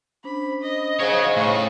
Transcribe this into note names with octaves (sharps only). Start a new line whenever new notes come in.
C#4 D4 C5 B5
D#5
G#2 C#3 F#4 G#4 C5 C#5 F5
A2 C#6